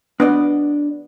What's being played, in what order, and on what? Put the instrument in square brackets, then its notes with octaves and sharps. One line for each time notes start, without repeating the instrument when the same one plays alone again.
[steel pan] B3 [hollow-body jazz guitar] D4 D5 D#5